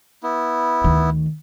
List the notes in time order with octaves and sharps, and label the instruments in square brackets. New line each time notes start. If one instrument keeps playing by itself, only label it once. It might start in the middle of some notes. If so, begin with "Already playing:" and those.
[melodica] B3 E4
[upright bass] D2 D#3